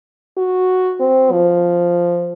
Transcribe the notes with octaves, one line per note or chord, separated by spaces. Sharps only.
F#4
C4
F3